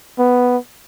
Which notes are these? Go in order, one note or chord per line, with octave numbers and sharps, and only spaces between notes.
B3